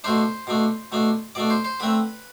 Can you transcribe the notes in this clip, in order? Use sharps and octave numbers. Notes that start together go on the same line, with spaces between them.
B2 A3 D4 C5
B2 A3 D4
B2 A3 D4
B2 A3 D4 D5
C5
C5
D3 A3 C4 B4